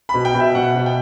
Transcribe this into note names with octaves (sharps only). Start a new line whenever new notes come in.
B2 B5
G5
B2
E5
B2 F#5
B2
G5